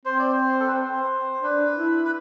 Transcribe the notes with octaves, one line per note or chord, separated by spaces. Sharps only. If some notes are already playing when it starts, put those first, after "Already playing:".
C4 C5
D5
C5
A4
B4
C5
D4 B4
E4
B4